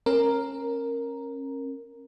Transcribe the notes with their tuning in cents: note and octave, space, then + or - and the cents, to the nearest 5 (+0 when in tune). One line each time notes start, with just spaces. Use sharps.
C#4 -30 A#4 +0